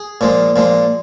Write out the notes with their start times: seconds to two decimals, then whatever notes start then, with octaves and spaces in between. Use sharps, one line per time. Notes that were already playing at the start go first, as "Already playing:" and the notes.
Already playing: G#4
0.21 A#2 F3 G#3
0.56 A#2 F3 G#3